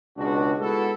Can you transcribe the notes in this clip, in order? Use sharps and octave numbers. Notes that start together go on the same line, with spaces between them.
C#2 B2 D4 F#4
G#3 B3 E4 F#4 A4